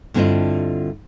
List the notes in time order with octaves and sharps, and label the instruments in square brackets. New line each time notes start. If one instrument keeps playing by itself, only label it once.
[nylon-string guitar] G2 D3 C4 E4 F4 D#5